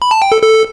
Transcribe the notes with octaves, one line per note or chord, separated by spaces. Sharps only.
B5
A5
G5
A4
A4